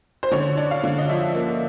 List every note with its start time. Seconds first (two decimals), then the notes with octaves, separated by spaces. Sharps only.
0.23 C5
0.31 D3 C#5
0.57 D4
0.71 F5
0.83 D3
0.98 D#5
1.09 F3 E5
1.35 A#3